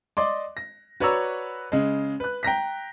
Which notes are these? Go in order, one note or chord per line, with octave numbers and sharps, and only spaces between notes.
D5 D#5 C6 D6
A#6
F#4 B4 C#5 D5 A#5 E6
C#3 G#3
B4 F#6
G5 A#5 A#6 B6